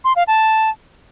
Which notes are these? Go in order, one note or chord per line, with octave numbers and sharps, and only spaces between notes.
C6
F5
A5